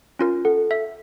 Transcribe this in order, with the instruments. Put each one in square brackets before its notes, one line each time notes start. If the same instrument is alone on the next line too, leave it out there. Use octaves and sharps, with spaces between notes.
[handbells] C#4 F4 A#4
[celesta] A4 [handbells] F#5
[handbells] E5